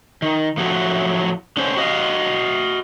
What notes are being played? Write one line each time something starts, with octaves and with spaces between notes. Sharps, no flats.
D#3
A2 F3 F#3 A3 F#4
D3 C#4 C5
F#4 D#5 F5